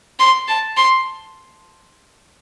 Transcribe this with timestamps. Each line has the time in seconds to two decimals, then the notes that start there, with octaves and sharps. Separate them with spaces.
0.19 C6
0.48 A5
0.77 C6